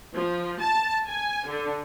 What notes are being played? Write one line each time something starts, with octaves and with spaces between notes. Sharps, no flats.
F3
A5
G#5
D3